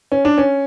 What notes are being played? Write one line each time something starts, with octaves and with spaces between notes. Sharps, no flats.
C#4
D4
C#4